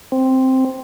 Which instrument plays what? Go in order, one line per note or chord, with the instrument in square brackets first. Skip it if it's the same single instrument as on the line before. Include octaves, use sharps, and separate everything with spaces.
[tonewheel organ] C4